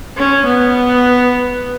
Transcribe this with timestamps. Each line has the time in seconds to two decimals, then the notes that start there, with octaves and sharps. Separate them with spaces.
0.17 C#4
0.46 B3